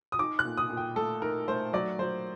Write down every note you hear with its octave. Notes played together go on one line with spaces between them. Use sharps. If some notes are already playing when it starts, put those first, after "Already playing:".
D#6
D#4 D6
F#6
A#2
D#6
A#2
G5
A3 A4
D#4 A#4
A3 C5
F#3 D5
F#3 C5